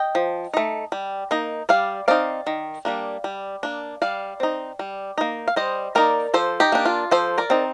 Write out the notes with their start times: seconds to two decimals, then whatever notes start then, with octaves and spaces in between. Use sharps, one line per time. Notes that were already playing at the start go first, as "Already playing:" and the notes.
Already playing: D#5 G5
0.15 F3
0.54 A3 D#4
0.92 G3
1.31 A#3 D#4
1.69 G3 D5 F5
2.08 C4 D#4 D5 F5
2.47 D#3
2.85 G3 A#3 D4
3.24 G3
3.63 A#3 D4
4.02 G3 D5 F5
4.40 C4 D#4
4.79 G3
5.18 A#3 D#4
5.48 F5
5.56 G3 C5 D#5
5.95 A#3 D#4 A#4 D5
6.34 F3 A4 C5
6.60 D#4 G4
6.72 A#3 D4
6.85 F4
7.11 F3 A4 C5
7.38 A#4 D5
7.50 C4 D#4